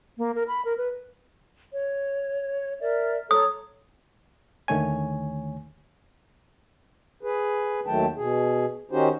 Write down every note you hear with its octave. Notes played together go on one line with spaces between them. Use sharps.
A#3
A#4
B5
A#4
B4
C#5
A#4 D5 E5
A4 C#5 A#5 D#6
D#2 D3 D#3 A3 C#5 G#5
G#4 B4
D#2 D#3 F#3 A3 G5 A5
B2 G#4
D#3 C#4 D#4 F#4 G4 C5